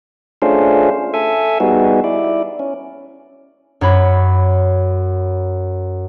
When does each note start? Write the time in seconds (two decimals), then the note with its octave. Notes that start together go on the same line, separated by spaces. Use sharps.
0.42 A3 C#4 D4 F4 G#4 C5
1.14 A4 E5 G#5
1.60 G3 B3 D#4 F#4 G#4
2.04 E4 D5
2.59 C#4
3.81 F#2 C#5 B5